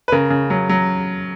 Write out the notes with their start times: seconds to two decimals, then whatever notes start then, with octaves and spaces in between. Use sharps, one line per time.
0.08 B4
0.12 C#3 A#4
0.30 C#3
0.50 F#3
0.69 F#3